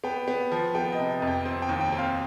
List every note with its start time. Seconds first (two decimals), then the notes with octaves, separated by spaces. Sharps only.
0.04 B3 G5
0.28 B3
0.52 F3
0.75 B3 G5
0.92 D#5
0.98 C3
1.09 D#5
1.22 F2
1.27 G5
1.45 C4
1.62 G5
1.69 D#2
1.81 G5
1.92 C4
1.98 F5